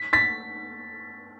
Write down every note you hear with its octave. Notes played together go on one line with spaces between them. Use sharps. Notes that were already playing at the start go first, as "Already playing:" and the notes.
Already playing: B6
A6 B6